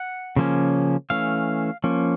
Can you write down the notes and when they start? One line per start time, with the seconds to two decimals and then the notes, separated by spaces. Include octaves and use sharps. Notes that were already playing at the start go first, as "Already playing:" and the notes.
Already playing: F#5
0.36 C#3 F3 A#3 C#4
1.10 E3 A3 C#4 F5
1.84 F3 A#3 C#4